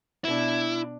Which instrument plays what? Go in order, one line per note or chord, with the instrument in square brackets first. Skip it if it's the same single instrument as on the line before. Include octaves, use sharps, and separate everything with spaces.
[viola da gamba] B2 D4 [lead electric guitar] E4